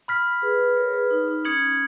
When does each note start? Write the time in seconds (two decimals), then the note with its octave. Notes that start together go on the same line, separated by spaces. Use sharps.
0.08 B5 F6 B6
0.42 G#4 B4
0.76 A#4 C#5
0.94 G#4 B4
1.11 D#4
1.28 D#4
1.45 C#4 D#6 G#6 C#7 F#7